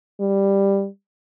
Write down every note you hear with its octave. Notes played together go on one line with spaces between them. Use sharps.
G3